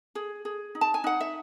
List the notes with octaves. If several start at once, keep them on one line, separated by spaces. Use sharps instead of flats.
G#4
G#4
D#4
A5
G#5
D#4 F#5
E5